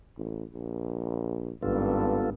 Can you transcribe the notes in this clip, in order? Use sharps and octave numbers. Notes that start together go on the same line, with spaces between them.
A1
A#1
G#1 G2 B3 F4 A4